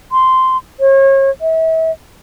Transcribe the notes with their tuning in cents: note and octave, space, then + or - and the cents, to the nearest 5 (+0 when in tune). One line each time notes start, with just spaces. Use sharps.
C6 -10
C#5 -35
E5 -35